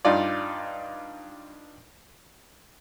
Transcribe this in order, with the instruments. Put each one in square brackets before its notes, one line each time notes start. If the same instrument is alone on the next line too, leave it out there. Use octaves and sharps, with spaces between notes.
[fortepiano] G2 D#4 F4 D5